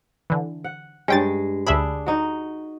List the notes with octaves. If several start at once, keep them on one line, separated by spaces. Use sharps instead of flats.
D3 E3
F#5
G2 G#3 C#4 G5 A6
D2 D4 G#4 E5 B5
D#4 F#4